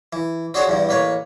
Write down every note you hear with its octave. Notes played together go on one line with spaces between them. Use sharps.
E3
C4 D4 F#4 G#4 C5 C#5
E2 G2 E3
A1 A#3 B4 C#5